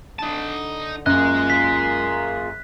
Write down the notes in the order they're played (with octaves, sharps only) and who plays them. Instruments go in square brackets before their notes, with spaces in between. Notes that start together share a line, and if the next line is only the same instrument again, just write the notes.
[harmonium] D3 [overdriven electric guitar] D#4 A5
[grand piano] F#2 [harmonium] A#3 F4 [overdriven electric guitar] G#4 D#5 [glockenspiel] F#6
[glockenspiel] B6